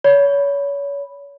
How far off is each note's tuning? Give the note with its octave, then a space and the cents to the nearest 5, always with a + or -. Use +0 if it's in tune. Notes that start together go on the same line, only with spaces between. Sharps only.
C#5 +30 B5 +0